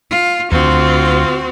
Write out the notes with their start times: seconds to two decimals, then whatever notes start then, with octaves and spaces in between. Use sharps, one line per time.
0.10 F4
0.52 D2 C4 F4 F#4